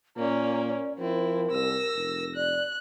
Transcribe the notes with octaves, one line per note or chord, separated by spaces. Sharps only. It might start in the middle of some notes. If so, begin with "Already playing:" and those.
A#2 A#3 C#4 D5
F3 C4 E4 A#4
C2 E6 A#6
F1
D5 F#6